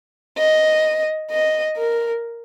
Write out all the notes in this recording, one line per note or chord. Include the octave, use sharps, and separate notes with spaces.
D#5
D#5
A#4